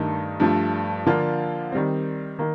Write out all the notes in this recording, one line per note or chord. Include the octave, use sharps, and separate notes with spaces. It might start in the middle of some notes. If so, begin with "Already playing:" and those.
Already playing: G2 D#3 A3 D#4
G2 F3 A3
D3 F3 A#3 D4 F4
D#3 G3 C4
D#3 A#3